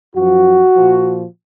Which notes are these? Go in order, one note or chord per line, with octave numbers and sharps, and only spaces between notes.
F#2 F3 F#4
A#2 F3